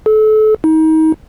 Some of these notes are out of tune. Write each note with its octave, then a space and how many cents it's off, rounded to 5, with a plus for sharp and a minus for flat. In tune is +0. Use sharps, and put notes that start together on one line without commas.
A4 -30
D#4 +30